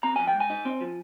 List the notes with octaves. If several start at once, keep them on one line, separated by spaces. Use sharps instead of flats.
C4 A#5
F3 G#5
G5
G#2
G#5
D#4
C4
F3